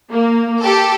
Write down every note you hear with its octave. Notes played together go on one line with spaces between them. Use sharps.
A#3
G4 A4